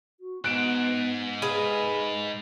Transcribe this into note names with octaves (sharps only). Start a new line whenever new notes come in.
F#4
G#2 B3 F#6 D7 E7
G#3 G#4 B4 F5